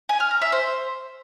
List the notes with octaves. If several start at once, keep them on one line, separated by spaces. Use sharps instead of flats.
G#5
F6
A#5
E5
C5